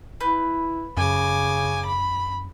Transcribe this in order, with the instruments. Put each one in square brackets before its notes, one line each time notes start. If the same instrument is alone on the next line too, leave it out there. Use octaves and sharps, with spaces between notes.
[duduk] E4 [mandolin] B4 G6
[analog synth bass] F#2 [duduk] C#3 [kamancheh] G#5 D6
[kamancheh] B5